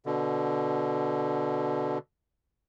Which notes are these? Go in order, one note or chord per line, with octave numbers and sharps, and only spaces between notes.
B2 D3